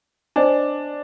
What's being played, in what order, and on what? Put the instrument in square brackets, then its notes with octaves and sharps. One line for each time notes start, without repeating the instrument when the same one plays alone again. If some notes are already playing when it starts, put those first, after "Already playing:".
[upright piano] D4 [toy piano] C5 D#5 G#5